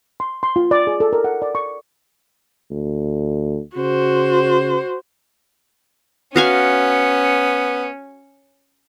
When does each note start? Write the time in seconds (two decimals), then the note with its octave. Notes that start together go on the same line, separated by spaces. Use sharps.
0.20 C6
0.43 C6
0.56 F4
0.71 D5
0.87 G#4
1.00 A4
1.13 A#4
1.24 F#5
1.42 D5
1.55 C#6
2.71 D2
3.77 C#3 F#4 C5
6.36 B3 C#4 F#4 F5 G#5